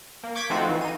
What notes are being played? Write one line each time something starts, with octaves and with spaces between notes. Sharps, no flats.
A#3
C#6 D6 G6 G#6 B6 D7
F3 A3 C4 D#4 F4 F#4
E3
D#4 D#7